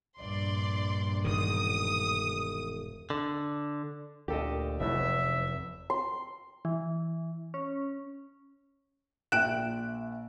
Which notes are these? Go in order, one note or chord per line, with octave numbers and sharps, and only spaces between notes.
A#1 G2 D5 C6
E1 D#3 D#6
D3
D2 A#2 G4 A4 D#5
F1 E2 A2 F#3 E5
C6
E3
C#4
A#1 E5 G5 F#6 D7 E7